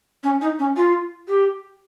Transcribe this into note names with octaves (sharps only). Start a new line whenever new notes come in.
C#4
D#4
C#4
F4
G4